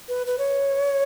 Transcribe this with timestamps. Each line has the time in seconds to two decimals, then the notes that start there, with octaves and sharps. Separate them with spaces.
0.08 B4
0.26 B4
0.38 C#5